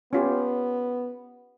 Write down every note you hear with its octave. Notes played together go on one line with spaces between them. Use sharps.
B3 C#4 F4 G4